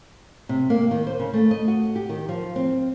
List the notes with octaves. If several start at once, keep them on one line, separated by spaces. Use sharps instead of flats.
C3
A#3
D#3
C5
C#3
A3
D#5
F#4
G4
D#3
F3
C4